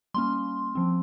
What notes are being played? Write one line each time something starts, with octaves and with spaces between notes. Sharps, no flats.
G3 A#3 C#4 C6
F3 C4